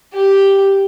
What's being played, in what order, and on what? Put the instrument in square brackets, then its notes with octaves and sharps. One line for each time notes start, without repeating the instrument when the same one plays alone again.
[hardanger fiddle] G4